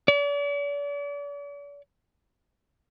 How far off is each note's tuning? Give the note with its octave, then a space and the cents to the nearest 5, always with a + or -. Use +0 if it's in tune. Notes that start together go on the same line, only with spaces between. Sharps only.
D5 -45